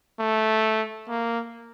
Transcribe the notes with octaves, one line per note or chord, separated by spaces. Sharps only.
A3
A#3